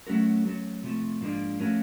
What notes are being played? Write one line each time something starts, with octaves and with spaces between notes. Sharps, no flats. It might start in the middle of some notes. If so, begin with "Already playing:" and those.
F#3 A3 C#4 F#4 A#4
F#3 A3 C#4
C3 F3 A3
G#2 F3 A#3 D4 F4
F3 A3 C#4 F#4 A#4